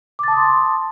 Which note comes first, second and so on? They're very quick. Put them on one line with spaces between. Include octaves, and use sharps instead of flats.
D6 A6 A5 D#6 C6